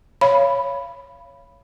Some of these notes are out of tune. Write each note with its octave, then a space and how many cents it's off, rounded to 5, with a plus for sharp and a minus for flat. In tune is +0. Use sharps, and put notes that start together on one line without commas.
C#5 +0 F5 -25 B5 +0